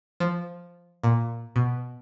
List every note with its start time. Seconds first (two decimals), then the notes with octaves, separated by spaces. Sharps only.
0.20 F3
1.04 A#2
1.56 B2